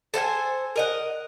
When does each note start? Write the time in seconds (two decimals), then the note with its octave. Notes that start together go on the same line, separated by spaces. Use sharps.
0.14 A4 C5 F5 G#5
0.76 A#4 D#5 F#5